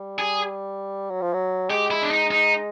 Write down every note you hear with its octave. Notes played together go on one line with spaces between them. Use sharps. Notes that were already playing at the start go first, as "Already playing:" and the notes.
Already playing: G3
G#4
F#3
F3
F#3
G#3 G4
E4
D4
D#4
D#4